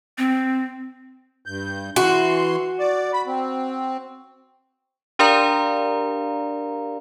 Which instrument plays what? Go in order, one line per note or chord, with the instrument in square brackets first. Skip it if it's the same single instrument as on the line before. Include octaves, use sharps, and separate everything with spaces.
[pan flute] C4
[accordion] G2 G6
[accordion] E3 C6 [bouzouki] F#4
[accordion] D5
B5
C4
[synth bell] D4 G4 A#4 D5 F5 A#5